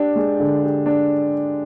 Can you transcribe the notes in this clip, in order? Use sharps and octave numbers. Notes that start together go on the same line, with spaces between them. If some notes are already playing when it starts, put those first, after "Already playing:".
Already playing: D4 G4
G#3
D3
G4
D4